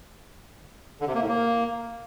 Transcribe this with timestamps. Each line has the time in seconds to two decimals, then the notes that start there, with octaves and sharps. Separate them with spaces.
1.01 D3
1.08 C3
1.15 A#3
1.22 A2
1.29 A#3